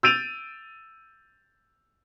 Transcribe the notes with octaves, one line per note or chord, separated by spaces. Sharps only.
E6 G6 A6 D7 D#7 F7